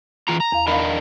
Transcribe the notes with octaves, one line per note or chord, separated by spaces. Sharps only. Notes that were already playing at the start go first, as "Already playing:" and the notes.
E3 F4 A#5
A#5
E2 F5
D4 A#4 D#5 F5 B5